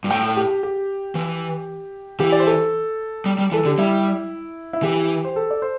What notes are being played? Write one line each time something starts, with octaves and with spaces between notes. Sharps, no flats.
G2
A2 G5
G4
G4
E3
E3 G4
D5
C5
A4
G3
G3
E3 A4
D3 G4
G3 E4
E4
E3 G4
C5
A4
D5
C5